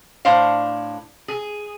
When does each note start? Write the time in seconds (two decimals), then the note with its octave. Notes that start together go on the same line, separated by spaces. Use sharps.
0.25 A2 D4 C5 F5
1.28 G#4